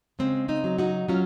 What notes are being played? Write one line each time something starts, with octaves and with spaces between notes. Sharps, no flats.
C#3 G#3 C4
C4 D#4
F#3
D#4 F#4
F#3 C#4 F4